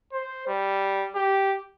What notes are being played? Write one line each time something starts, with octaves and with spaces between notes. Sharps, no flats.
C5
G3
G4